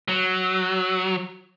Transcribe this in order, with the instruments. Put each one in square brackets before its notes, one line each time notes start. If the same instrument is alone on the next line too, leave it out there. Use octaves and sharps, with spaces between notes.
[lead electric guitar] F#3